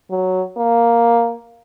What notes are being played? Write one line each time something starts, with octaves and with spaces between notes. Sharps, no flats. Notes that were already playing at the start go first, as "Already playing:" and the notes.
F#3
A#3